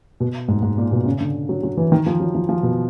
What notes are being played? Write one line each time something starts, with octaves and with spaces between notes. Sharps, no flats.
B2
G#2
G#2
A#2
B2
C#3
D3
F#3
F#3
E3
D#3
F3
F#3
F3
F3
B2